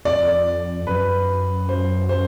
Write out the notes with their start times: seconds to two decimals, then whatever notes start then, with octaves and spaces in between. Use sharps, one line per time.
0.05 F2 D5
0.87 F#2 B4
1.69 C5
2.09 C5